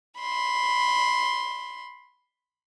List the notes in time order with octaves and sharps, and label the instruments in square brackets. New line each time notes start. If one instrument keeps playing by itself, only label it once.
[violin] B5 C6